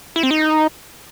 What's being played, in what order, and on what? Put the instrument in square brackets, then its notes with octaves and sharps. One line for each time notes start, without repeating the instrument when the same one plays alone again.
[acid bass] E4
C4
D#4